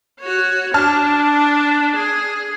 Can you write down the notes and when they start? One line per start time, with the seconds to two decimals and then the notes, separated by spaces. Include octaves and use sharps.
0.20 F#4 C#5
0.74 D4 A5 F6
1.96 G#4